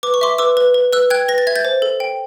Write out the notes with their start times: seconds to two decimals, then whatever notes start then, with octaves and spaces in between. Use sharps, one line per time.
0.03 B4 D6
0.14 C#6
0.21 E5 C6 D6
0.38 B4 D6 E6
0.57 B4
0.74 B4
0.93 B4 E6 F#6
1.10 G5 F#6 G#6
1.28 B4 A#6
1.38 A6
1.47 E5 G#6
1.56 G6 A6
1.65 C5
1.82 A4
2.00 G5